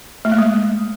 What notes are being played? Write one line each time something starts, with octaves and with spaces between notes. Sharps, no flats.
A3
A#3
G#3